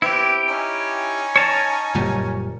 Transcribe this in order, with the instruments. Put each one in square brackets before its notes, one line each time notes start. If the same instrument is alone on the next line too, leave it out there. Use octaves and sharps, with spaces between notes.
[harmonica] B3 C4 B4 [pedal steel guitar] E4 G4
[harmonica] C#4 D#4 G#5
[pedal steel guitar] C#5 A5 A#5
[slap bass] F#1 A#2 G3